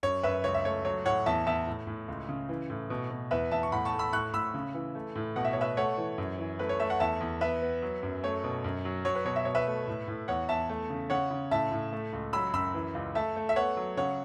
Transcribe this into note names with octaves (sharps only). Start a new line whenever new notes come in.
F#2 C#5
F#2 B4 E5
C#2 C#5
E5
A3 C#5
F#3 C#5
A2 C#5 F#5
E2 E5 A5
E2 E5 A5
A2
A2
C#2
C#3
E3
A2
B2
B2
E2 B4 E5
E2 E5 A5
C#6
A2 F#5 B5
A5 C#6
A3
B5 E6
A2 C#6 F#6
A2 B5 E6
C#3
E3
A3
A2
B2 F#5
E5
C#5
B2 B4 E5
A3 C#5 F#5
E3
F#2
E3
A3 B4
C#5
A3 E5
F#5
E2 E5 A5
E2
B3 B4 E5
B3
F#3
F#2
A3 C#5
B2
F#2
F#3
F#3 C#5
B4
B2 C#5
E5
B2 C#5
B4 E5
A3
A2
A2
E2 C#5 F#5
E2 E5 A5
A3
C#3
C#3 C#5 F#5
C#3
A2 E5 A5
A2
A3
C#2
F#3 B5 E6
F#2 B5 E6
E3
C#2
A3 E5 A5
A3
E5
B3 C#5 F#5
F#3
C#3 C#5 F#5